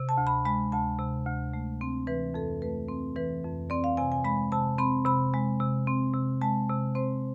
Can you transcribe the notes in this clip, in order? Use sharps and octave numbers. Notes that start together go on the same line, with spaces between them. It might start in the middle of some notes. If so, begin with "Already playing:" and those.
Already playing: C3
A5
D2
B5
G#3 B5
D2 A5
C3
D2
A3
C4
E3 B4
F2 A4
A3 B4
C4
E3 B4
F2
C4 D5
F5
C3 G#5
G#5
G#3 B5
C3 A5
C4 B5
C3 B5
G#3
C3
C4
C3
G#3 A5
C3
C4 C5